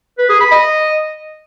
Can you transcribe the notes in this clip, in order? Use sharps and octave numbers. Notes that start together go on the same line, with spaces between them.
B4
G#4
B5
D#5